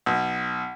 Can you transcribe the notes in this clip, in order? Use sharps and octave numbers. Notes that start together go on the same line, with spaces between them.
B1